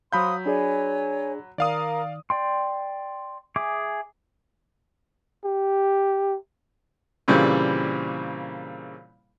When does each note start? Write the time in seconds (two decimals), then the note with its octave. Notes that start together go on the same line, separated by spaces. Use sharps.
0.13 F#3 C5 F5 B5 C6 D#6 G6
0.46 D4 G#4 C#5 D5 G#5
1.58 D#3 A#4 D5 F5 D#6
2.30 D5 G5 C6
3.56 G#4 E5 G#5 D6
5.45 G4
7.28 A#2 C#3 E3 G3 C4